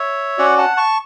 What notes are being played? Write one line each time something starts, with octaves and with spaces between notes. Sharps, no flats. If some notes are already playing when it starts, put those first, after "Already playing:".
Already playing: C#5 E5
C#4 F#4 D5 F#5
F#5 A5
A5 C#6